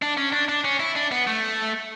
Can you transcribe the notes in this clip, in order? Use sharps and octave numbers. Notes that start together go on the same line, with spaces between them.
D4
C#4
D4
D4
C#4
E4
D4
B3
A3